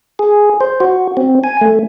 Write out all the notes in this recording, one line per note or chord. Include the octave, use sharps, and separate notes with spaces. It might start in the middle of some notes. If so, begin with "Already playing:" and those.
G#4
C5
F#4
C4
G#5
A3